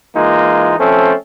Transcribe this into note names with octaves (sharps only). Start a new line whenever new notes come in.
E3 G#3 A#3 D#4 F4
F3 A3 C4 C#4 A4